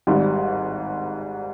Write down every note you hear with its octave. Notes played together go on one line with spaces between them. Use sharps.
G#1 G#2 G3